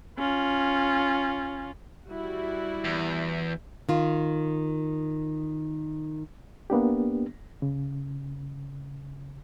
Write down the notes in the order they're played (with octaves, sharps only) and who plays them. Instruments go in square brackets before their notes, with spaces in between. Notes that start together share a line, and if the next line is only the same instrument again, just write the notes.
[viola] C#4 F4
[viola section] G3 E4 F#4
[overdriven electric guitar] E2
[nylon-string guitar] D#3 F4
[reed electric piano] A#3 B3 D4 G4
C#3